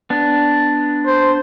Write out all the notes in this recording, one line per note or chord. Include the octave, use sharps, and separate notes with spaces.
B3 D4
C5